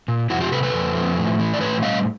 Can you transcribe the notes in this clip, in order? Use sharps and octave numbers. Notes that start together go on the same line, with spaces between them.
A#2
F2 E4 F#4
F4 G4
C3 A4 B4
A4 B4
F2
F3
A2
E3
D5
A2 B4 C#5
G3 D#5 F5